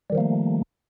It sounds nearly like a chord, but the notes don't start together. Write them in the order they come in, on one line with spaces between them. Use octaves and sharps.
G3 D#3 F3 A#3 A3